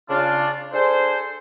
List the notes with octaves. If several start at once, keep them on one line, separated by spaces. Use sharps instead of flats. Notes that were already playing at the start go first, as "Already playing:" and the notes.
C#3 D4 F4
D4 G#4 A4 C5